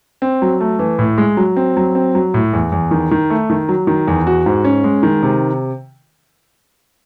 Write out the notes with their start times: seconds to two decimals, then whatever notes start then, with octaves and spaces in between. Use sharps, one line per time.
0.22 C4
0.42 F#3
0.61 A3
0.79 E3
0.99 A2
1.18 G#3
1.37 F#3
1.56 C4
1.77 F#3
1.95 C4
2.15 F#3
2.34 A2
2.53 E2
2.72 E2
2.91 D#3
3.11 D#3
3.30 A3
3.50 D#3
3.69 F#3
3.87 D#3
4.08 E2
4.27 F#4
4.46 G#2
4.65 C#4
4.84 G#3
5.03 D#3
5.23 C3